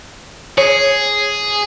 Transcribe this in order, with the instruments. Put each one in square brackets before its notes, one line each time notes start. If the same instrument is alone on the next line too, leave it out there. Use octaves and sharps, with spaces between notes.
[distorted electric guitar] G#4 [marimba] C#5